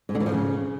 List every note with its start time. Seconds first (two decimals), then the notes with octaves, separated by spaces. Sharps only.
0.09 G#2
0.15 D3
0.20 E3
0.26 F3
0.32 C#3